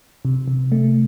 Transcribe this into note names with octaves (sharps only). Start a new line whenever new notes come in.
C3
C3
A3